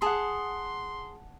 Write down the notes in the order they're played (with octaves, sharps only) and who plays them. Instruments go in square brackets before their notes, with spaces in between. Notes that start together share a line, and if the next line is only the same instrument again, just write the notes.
[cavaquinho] G#4 [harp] F#5 A5 [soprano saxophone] C6